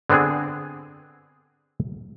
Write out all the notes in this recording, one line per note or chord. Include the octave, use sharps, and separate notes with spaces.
D3 B3 C4 D4 G#4